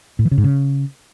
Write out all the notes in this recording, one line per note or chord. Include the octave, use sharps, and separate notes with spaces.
A2
E3
C#3
G#2
C#3